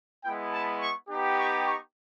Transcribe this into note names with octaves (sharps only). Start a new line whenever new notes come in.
G#3 B3 E4 G5
A5
C#6
B3 D#4 G4
C#6
C#6